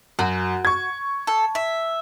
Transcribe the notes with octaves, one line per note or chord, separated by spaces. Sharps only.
F#2 F#4
C#6 G#6
A4
E5